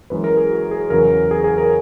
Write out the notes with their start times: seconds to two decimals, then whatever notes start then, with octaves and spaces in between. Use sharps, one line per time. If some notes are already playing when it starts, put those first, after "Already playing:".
0.10 F#2 E3 G#3 B4
0.24 A#4
0.37 G#4
0.50 F#4
0.71 G#4
0.90 E2 C#3 F#3 A#4
1.31 G#4
1.44 G#4
1.58 A#4